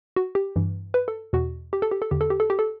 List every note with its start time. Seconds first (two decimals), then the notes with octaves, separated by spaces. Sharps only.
0.16 F#4
0.35 G4
0.56 G2 E3
0.94 B4
1.08 A4
1.33 E2 B2 F#4
1.73 G4
1.82 A4
1.91 G4
2.02 A4
2.11 E2 D3 G4
2.21 A4
2.30 G4
2.40 A4
2.50 G4
2.59 A4